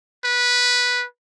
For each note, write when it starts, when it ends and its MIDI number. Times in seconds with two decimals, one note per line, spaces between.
0.25 1.05 71